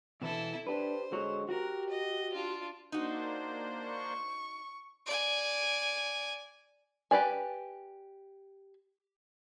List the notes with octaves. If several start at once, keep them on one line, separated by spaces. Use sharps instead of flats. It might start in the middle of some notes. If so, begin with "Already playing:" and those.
B2 E3 E4 A4
D4 G4 B4 C5
D3 G#3 F#4 C#5
F#4 G4 A#4
D#5
D4 F4
A#3 D4 D#4 F#4 C5
C#6
D5 G#5
G4 B4 D5 G#5